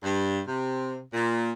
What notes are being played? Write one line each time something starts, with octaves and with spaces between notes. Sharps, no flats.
G2
C3
A#2